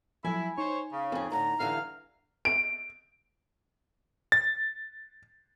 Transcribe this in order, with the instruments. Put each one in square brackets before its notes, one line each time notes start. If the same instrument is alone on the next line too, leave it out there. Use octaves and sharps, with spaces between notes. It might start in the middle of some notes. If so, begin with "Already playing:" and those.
[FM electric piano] F3 F#3 [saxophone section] A3 E4 [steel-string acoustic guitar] G#5
[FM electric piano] D#4 [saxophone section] C5 C#5
[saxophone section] C#3
[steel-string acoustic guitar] F2 G#4
[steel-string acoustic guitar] A2 D3 [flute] A#5
[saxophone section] G2 F5 [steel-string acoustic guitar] D3 E3
[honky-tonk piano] D7
[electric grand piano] A6